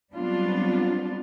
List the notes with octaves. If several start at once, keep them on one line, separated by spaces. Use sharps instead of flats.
F#3 G3 B3 C4 D4 F4